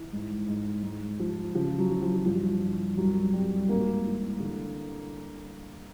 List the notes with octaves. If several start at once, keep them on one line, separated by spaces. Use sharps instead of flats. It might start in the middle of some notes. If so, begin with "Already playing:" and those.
Already playing: E3
G#2
G#2
G#2
F3
C#3 F3
F#3
E3
F3
G2 F3
G2
C2 F#3
C2 G3
G#2 A#3
E3
D3